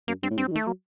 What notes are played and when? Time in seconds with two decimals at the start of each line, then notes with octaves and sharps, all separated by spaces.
0.08 F#2 A#3
0.23 G2 C4
0.30 A2
0.37 G2 C4
0.48 F#3
0.51 D#3
0.55 A3
0.66 F#3 A#3